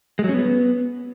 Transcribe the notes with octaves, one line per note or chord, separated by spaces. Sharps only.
G#3
F#3
C#4
B3